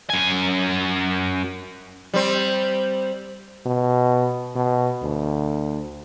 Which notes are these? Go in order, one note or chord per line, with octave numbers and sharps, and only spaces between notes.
F#2 G#5
G3 C4
B2
B2
D2